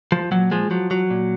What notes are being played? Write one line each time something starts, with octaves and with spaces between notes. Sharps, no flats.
F3
A#2 F#3
F3 G#3
F3 F#3
F#3
A#2